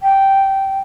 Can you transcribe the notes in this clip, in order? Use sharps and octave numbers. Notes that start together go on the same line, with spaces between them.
G5